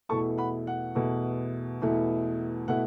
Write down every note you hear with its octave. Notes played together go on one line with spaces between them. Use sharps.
E2 B2 A3 E4 A5 C#6
F#5 B5
F#5
E2 B2 A3 E4
E2 B2 A3 E4
B2 A3 E4 F#5